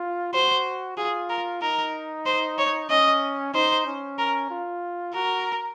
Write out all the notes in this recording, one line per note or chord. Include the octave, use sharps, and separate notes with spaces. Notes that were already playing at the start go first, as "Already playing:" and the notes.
Already playing: F4
F#4 C5
F4 G#4
A#4
D#4 A#4
C5
C#5
C#4 D#5
D#4 C5
C#4
A#4
F4
F#4 A#4